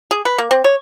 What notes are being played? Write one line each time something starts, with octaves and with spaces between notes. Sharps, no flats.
G#4
B4
A#3
C4
C#5